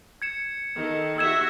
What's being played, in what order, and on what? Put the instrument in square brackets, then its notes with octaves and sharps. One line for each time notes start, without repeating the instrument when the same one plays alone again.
[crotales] G#6 C#7 E7
[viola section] D#3 A4
[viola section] F#4 E5 [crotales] E6 G#6 E7